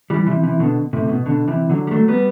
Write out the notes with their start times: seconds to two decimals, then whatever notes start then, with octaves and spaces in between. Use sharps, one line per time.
0.10 E3 G3
0.27 C3 E3
0.43 C3 E3
0.60 B2 D3
0.93 A2 C3
1.04 C3
1.09 B2
1.26 B2 D3
1.48 C3 E3
1.70 D3 F#3
1.87 G3
1.91 F#3 A3
2.08 G3 B3